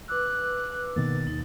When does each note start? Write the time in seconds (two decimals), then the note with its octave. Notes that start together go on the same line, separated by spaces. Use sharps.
0.08 B4 D6 E6 F#6
0.96 B2 D#3 A#3 A6
1.27 D#2 D#4